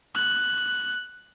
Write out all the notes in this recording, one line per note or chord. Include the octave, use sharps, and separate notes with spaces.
F#6